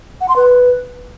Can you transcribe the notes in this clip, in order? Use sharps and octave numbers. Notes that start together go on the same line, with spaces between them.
F#5
C6
B4